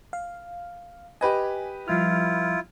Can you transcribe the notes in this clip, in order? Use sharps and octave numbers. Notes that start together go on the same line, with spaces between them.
F5
G4 B4 D#5 G#5
F3 G3 E4 F4 F6